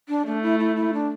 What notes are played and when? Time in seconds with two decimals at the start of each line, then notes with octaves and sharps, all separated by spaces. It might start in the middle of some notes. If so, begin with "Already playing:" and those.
0.09 D4
0.26 A3 D4
0.43 E4
0.60 E4
0.76 E4
0.93 D4